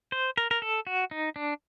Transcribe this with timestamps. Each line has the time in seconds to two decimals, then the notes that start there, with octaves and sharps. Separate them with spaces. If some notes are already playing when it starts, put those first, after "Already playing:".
0.12 C5
0.37 A#4
0.51 A#4
0.62 A4
0.87 F#4
1.11 D#4
1.36 D4